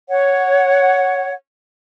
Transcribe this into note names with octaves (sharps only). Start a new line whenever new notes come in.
C#5 F#5